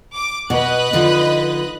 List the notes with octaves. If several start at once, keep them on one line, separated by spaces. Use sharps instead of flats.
D6
B2 B4 D#5 F#6
D3 F3 D#4